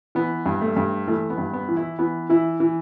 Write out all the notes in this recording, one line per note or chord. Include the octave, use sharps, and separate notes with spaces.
E3 B3
G2
A3
G2
E3 A3
B3
G2
B3
E3
E4
E3 B3
E3 E4
E3